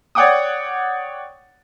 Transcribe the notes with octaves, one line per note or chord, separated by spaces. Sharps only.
C#5 D5 F#5 G5 D6 D#6